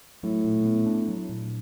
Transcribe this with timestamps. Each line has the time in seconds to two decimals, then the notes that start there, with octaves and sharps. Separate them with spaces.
0.23 A2 F#3
0.45 A#2
0.65 B3
0.86 D4
1.08 F#3
1.29 A#2